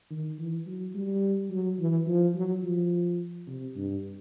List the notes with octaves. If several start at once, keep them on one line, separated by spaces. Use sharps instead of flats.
D#3
E3
F#3
G3
F#3
E3
F3
F#3
F3
C3
G2